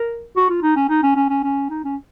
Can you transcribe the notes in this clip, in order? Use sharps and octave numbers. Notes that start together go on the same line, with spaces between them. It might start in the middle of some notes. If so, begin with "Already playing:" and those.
Already playing: A#4
F#4
F4
D#4
C#4
D#4
C#4
C#4
C#4
C#4
D#4
C#4